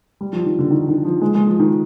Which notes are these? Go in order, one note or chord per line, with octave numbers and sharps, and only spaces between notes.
G3
F3
D#3
D3
D#3
D#3
F3
G#3
G#3
F3
D#3